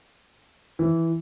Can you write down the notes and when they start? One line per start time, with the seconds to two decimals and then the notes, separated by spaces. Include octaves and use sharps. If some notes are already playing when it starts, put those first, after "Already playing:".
0.79 E3